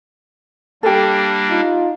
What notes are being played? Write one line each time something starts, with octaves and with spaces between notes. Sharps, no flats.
G3 A#3 D4 G4 A4
D#4 F4